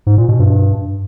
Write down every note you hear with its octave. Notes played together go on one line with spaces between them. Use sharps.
G#2
A#2
B2
G2